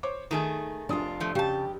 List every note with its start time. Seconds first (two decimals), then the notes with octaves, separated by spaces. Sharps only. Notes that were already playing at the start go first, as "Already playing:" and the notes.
0.03 C5 C#5 D6
0.31 D#3 A3 D#4 G#4
0.89 F1 D4 F4 D#6
1.20 F3 A3
1.35 C#3 G4 A5